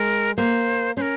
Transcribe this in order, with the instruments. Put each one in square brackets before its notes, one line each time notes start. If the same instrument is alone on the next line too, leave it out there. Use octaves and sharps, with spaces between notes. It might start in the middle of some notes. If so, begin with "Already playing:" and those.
Already playing: [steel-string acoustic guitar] G#3 [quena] A#4
[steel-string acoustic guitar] A#3 [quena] C5
[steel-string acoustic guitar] C#4 [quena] C5
[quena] A#4